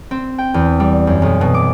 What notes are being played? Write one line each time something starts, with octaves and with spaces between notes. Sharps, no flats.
C4
G5
E2
G3
F#2
B1
B2
D6